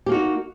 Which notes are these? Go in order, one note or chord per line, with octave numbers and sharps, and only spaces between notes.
A#3 D#4 F#4 G4